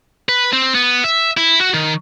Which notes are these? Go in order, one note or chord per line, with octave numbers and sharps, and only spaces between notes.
B4
C4
B3
E5
E4
F#4
D#3